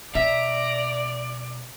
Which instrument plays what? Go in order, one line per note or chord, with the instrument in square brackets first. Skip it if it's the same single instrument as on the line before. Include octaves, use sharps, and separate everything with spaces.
[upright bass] B2 [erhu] D5 [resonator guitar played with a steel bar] E5 [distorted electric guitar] A#5